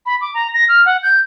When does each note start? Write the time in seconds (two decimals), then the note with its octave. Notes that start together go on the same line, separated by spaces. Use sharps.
0.06 B5
0.21 D6
0.34 A#5
0.54 A#6
0.69 F6
0.86 F#5
1.03 G6